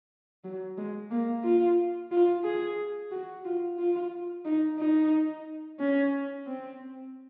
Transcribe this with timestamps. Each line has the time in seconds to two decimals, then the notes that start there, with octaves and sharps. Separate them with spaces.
0.44 F#3
0.77 G#3
1.11 A#3
1.44 F4
2.11 F4
2.44 G#4
3.11 F#4
3.44 F4
3.78 F4
4.45 D#4
4.79 D#4
5.79 C#4
6.46 C4